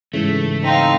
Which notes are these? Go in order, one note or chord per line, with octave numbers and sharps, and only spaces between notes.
G#2 C#3 E3 A3
C4 D#4 F5